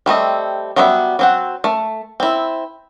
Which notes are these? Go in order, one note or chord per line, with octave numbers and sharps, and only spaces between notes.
G3 A3 C4 D#5
F#3 G3 B3 F#4 E5
F#3 C4 F#5
A3
C4 E4